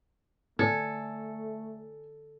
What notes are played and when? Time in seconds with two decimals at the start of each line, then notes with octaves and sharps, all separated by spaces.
0.59 D3 A3 A4 G#5